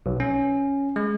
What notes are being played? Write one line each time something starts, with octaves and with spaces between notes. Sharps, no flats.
B1
C#4
G#3